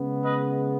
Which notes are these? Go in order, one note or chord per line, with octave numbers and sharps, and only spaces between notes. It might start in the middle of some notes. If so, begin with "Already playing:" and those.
Already playing: C#3 G#3 B3
B4 D#5